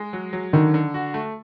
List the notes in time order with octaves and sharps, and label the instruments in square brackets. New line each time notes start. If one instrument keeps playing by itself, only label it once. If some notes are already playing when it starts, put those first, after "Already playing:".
Already playing: [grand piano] G#3
F#3
F#3
[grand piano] D3 [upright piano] D#3
[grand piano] D3
F#4
A3